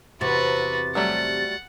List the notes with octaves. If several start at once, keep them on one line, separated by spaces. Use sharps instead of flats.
E2 C3 F#4 B4 A6
F#3 G3 A3 F#5